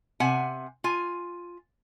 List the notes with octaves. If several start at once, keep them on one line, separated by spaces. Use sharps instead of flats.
C3 F#5 G#5
F4 G#5